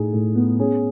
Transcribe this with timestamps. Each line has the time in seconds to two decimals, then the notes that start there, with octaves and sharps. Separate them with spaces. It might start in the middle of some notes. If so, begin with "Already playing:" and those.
Already playing: A2 D#4 G#4
0.13 A2
0.35 B3
0.59 C#4 G#4